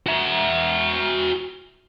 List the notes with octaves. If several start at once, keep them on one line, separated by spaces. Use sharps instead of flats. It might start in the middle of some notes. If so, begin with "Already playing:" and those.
F#4 E5